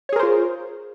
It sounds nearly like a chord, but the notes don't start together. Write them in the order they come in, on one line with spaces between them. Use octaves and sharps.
C#5 G#4 A#4 C5 F4